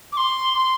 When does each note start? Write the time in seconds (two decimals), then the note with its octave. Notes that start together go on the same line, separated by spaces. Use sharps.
0.12 D6
0.17 C6
0.53 C6